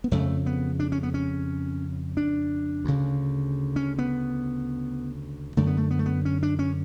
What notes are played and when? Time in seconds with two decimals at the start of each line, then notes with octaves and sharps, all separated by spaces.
0.04 B3
0.11 F2 C#3 A3
0.46 B3
0.80 D4
0.92 C#4
1.03 B3
1.14 C#4
2.17 D4
2.85 D2 C#3
3.76 C#4
3.99 B3
5.57 F#2 D3 A3
5.67 B3
5.77 A3
5.91 B3
5.99 A3
6.06 B3
6.25 C#4
6.43 D4
6.59 C#4